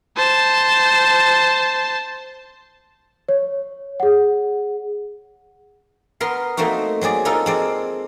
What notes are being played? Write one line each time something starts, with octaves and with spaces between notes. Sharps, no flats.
C5 A5
C#5
G#4 F#5
B3 A#4 C6
A3 A#3 C4 D#4 F#4
F#3 C4 G#4 D5
D#4 F4 A4 A#4
G#3 C4 D5